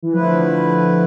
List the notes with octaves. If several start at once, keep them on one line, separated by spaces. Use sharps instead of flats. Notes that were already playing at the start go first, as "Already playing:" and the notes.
E3
D3 F3 A3 E4 B4